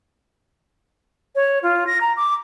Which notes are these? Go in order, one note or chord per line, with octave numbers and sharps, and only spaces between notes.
C#5
F4
A#6
A#5
D6